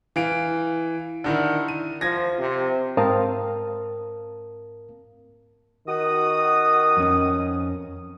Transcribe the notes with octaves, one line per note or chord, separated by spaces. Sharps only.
E3 F5 D7
D3 D#3 E4
D#7
F3 G#6 A#6
C3
G#2 C4 A#4 F5 A5 D#6
D#3 F#4 D#6
F2 C#4